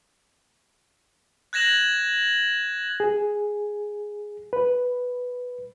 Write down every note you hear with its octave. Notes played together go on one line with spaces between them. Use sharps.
F#6 G#6 A#6 E7 F#7
G#4
B4